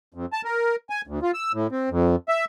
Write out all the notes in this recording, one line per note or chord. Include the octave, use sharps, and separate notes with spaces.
F2
A5
A#4
G#5
D2
F4
E6
A2
C4
F2
E5